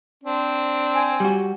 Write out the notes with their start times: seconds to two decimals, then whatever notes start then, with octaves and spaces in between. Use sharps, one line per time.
0.24 C4 D4
0.94 G#5
1.20 G3 F#4